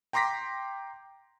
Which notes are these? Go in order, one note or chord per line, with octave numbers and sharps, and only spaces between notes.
G5 A#5 C6 D6 A#6 B6